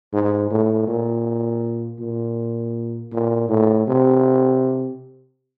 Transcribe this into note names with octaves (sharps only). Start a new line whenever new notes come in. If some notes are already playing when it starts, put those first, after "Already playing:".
G#2
A2
A#2
A#2
A#2
A2
C3